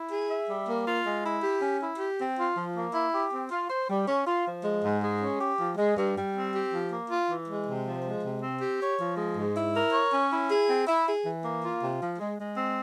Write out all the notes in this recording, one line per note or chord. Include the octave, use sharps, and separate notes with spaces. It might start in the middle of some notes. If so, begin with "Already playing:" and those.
Already playing: E4
G#4
E5
G3
A#3
F4
G#3
E4
G4
C#4
E4
G4
C4
F4
F3
A#3
E4
G4
C4
F4
C5
G3
C#4
F4
F3
G#3
G#2
G#3
C#4
G4
F3
G#3
G2
G3
C4
G4
F3
A#3
F4
E3
G#3
C3
F3
G#3
C3
C4
G4
C#5
F3
G#3
G#2
E4
A#4
C#5
C#4
E4
G#4
C4
E4
G#4
E3
A#3
F4
C3
F3
G#3
G#3
C4